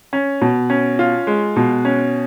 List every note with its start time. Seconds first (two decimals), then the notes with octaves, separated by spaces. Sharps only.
0.13 C#4
0.41 B2
0.70 C#4
0.99 F4
1.27 G#3
1.56 B2
1.85 C#4